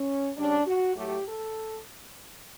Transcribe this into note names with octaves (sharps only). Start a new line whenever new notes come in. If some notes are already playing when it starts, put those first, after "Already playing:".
Already playing: C#4
C#3 G3 C#4 D4
F#4
A2 F#3 A3 G4
A4